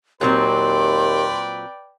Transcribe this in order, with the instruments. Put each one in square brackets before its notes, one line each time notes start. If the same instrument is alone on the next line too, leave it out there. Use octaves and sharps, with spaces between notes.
[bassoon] D#2 [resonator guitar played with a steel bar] A#2 F#3 C4 [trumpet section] B4 D5 G5 [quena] C6